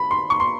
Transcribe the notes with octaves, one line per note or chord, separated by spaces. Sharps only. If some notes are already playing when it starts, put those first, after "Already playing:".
Already playing: B5
C6
C#6
C6